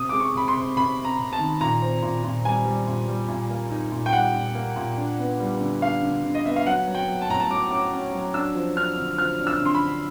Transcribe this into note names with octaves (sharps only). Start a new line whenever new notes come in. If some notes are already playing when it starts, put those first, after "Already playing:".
Already playing: C3 D#6
G#3 D6
C#6
C3 B5
C6
C3
C3 B5
C3
A#5
C3
A5
D#3
A#2 A#5
C4
A#2
A#2
G3 G#5
G3
A#2
G3
A#2
A#3
D#4
A#2
G5
G3 F#5
A#2
A#3
A#2
D4
B3
G3
D3
D4 F5
D3
D3
D#5
B3 E5
F5
F#3 F#5
F#3
G5
F#3
A5
A2 A#5
A5
F#3 D6
C#4 D6
C#4
F#3
D4 E6
F3
D4 F6
D3
F3 F6
D4
E6
D3
C6
B5
D4